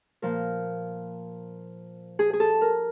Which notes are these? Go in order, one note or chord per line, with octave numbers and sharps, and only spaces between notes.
A#2 F3 A#4
G#4
G#4
A4
A#4